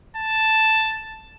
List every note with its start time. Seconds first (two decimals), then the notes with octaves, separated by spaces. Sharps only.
0.17 A5